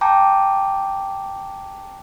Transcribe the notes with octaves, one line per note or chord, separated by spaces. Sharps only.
G5 A5 A#5 D6 G6